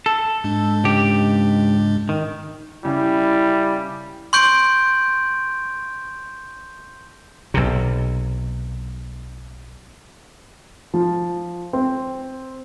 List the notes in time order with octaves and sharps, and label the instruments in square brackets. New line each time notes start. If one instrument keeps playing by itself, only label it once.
[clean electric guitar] A4
[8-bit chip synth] G#2 G#3 D4
[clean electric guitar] C#2 G4
D#3
[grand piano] C#3 [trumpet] G3 [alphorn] E4
[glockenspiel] C6 C#6 G6 D7
[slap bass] B1 C3
[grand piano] F3
C4